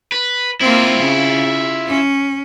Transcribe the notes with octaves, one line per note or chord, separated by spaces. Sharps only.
B4
A#3 C4 E4 F4
C#3
C#4